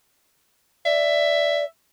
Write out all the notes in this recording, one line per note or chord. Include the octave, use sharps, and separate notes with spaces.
D5 E5